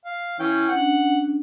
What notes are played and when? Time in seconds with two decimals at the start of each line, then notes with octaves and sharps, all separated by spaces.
0.05 F5
0.39 E3 C#4 G5
0.69 C#4 D4 F#5